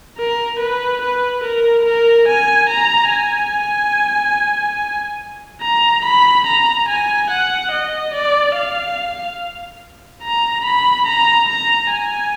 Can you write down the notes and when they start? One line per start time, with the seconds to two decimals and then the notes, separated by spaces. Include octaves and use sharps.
0.18 A#4
0.60 B4
1.02 B4
1.44 A#4
1.85 A#4
2.28 G#5
2.69 A#5
3.11 G#5
5.62 A#5
6.04 B5
6.47 A#5
6.89 G#5
7.30 F#5
7.72 D#5
8.14 D5
8.55 F5
10.23 A#5
10.65 B5
11.06 A#5
11.49 A#5
11.90 G#5